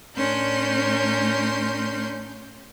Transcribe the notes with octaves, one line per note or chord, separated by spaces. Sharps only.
A2 C#4 D4 A#4 C6 G6